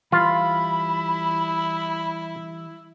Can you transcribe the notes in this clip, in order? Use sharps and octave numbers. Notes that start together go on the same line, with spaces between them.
E3 G3 E4 F4 B4 B5